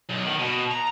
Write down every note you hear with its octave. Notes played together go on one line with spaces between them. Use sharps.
B1
D#3
B2
A#5